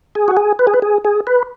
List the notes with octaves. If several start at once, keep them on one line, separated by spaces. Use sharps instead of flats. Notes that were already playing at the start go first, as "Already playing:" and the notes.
G#4
F#4
G#4
B4
G#4
B4
G#4
G#4
B4